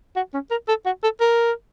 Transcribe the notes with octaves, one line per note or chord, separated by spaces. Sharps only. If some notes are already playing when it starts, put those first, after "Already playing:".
F#4
C#4
A#4
A4
F#4
A4
A#4